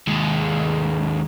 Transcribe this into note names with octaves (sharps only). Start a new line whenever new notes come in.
D#2 G#3